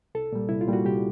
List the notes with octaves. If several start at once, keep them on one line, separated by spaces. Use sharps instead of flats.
C2 A4
A#2 G3
C2 E4
F4
A#2 G3 F#4
C2 G4